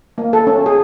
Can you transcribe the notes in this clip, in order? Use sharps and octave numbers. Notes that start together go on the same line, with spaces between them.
A#3
A4
C#4
G#4